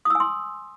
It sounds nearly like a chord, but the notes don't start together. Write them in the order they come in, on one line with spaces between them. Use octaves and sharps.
D#6 E6 G#5 C6